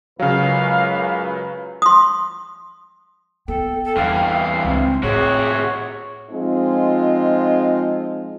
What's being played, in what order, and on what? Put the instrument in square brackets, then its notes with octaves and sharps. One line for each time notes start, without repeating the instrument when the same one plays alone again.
[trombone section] C#2 F#2 B4 [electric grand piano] C#3 F#3 [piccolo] F5
[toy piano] C6 D#6
[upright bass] B3 [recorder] A4 [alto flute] G5
[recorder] A4
[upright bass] E2 [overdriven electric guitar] G2 E3 [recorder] F5
[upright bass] C#2 [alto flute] C4
[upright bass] A2 [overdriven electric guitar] C3 F#4 [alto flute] G#4 [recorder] C#5
[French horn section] F3 G#3 C4 D#4 F4